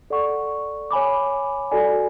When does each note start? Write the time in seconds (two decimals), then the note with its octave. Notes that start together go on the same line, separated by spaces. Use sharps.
0.10 A4 D5 F#5 C#6
0.91 C#5 G#5 B5 D6
1.71 F#4 A4 D5 G#5